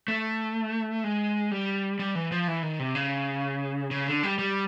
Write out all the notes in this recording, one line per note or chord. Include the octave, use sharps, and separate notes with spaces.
A3
G#3
G3
G3
E3
F3
E3
D#3
C3
C#3
C#3
D3
G3
G3